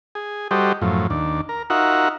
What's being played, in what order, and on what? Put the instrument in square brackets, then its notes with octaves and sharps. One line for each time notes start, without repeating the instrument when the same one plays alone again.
[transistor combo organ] G#4
G3 F#4 G4 A4 C5 D#5
F#2 A2 F3
D#2 D4
A#4
D#4 F4 F#4 A#4 E5 F#5